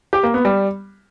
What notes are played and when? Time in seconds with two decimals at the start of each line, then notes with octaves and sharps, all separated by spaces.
0.13 G4
0.23 A#3
0.34 B3
0.45 G3